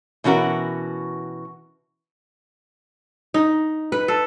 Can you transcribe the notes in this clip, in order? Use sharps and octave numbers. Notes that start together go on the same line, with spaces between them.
B2 E3 C#4 F#4 A#4
D#4
B4
A4